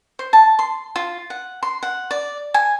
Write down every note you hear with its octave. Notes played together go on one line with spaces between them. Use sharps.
C5
A5
C6
F4
F#5
C6
F#5
D5
G#5